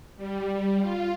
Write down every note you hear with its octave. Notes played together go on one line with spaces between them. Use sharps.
G3
F4